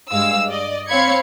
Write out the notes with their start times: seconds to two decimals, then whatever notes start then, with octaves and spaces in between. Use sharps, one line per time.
0.11 G2 G#3 F5 E6
0.48 D5 D#5
0.88 C4 C#5 F5 B5 G#6 C#7